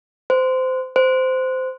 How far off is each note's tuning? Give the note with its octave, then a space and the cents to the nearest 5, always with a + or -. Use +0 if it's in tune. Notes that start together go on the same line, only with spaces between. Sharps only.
C5 -20
C5 -15